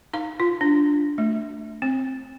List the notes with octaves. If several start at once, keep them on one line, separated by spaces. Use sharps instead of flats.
D#4 F5
F4
D4
A3
C4